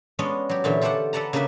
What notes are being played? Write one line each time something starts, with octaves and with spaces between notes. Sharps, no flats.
G#3 B3 C#4 D4 C#5 D#5
F#3 G4
A#2 D3 E3 C#4 E5
F4 G4 A4 C5 D5 F#5
A4 B4 D5 F#5 A5 A#5
C#3 A#3 D4 A#4 B4 E5